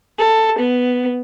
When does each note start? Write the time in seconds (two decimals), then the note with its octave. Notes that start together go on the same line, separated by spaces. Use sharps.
0.18 A4
0.58 B3